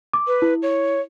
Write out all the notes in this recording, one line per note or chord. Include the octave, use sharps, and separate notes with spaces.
D6
B4
E4
C#5